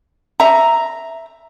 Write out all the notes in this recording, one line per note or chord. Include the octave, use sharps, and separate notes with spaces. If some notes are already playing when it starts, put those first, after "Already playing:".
E5 A#5